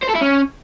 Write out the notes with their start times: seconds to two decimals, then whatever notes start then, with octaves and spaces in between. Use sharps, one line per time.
0.03 C5
0.09 A4
0.15 E4
0.21 C#4